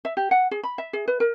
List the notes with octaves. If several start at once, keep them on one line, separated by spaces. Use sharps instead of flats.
E5
G4
F#5
G#4
B5
E5
G#4
B4
A#4